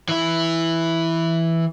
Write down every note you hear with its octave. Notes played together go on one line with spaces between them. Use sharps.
E3 E4